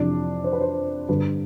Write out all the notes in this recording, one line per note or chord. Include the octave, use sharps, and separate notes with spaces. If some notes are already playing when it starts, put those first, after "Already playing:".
Already playing: F2 C3 E3 D4
C5
B4
C5
G2 D3 B4